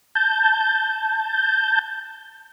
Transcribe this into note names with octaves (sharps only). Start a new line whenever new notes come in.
A5 G6